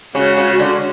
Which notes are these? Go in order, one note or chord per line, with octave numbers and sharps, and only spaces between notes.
C#3 G#3 C#4 F#4
C#3
D3